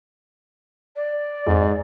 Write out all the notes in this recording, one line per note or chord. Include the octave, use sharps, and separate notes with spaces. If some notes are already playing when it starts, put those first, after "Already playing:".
D5
F2 G#2